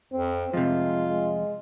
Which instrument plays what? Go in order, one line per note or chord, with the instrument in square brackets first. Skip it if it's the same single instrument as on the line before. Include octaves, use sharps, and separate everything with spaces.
[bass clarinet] F2 [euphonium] C4
[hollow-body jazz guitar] F2 C3 [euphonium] G#3 [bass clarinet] F4
[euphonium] G#3